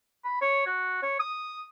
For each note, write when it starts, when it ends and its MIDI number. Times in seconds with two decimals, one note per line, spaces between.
0.24 0.40 83
0.42 0.66 73
0.66 1.00 66
1.02 1.17 73
1.20 1.65 87